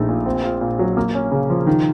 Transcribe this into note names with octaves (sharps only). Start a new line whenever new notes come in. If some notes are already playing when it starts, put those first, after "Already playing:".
Already playing: A#1 A3 D#4
A#2
C4
F4
A#2
F#3
A#3
C#4
C#3
F3
D#3